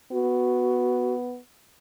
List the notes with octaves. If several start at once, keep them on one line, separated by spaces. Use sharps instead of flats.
B3 F#4